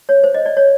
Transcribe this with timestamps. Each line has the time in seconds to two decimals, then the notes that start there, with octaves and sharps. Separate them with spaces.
0.09 C#5
0.24 C5
0.35 D#5
0.46 D5
0.57 C#5